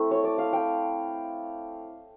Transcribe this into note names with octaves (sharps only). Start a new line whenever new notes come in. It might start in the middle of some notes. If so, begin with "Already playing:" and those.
Already playing: A3 C4 E4
C#5
D5
F5
G5